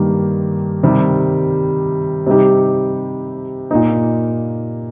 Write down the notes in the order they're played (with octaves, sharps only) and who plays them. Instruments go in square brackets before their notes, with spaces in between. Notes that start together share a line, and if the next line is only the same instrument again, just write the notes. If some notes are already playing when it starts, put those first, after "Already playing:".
Already playing: [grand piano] G2 D#3 A#3 G4
C3 D#3 G3
C3 G3 D#4 G4
A#2 A#3 D#4